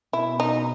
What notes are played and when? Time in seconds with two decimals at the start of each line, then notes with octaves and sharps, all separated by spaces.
0.13 B2 E4
0.40 D#4